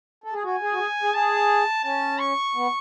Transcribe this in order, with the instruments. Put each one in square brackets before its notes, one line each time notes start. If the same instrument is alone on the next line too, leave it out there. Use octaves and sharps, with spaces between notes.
[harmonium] A4
G#4
[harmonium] F#4 [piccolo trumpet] G#5
[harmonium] G#4
F#4
G#4
G#4
[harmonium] G#4 [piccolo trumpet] A5
[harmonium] C#4 [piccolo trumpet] A5
[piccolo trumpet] C#6
[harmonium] B3